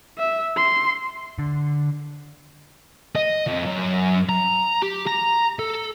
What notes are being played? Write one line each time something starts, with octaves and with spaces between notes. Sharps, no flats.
E5
C6
D3
D#5
F2
F#2
A#5
G4
A#5
A4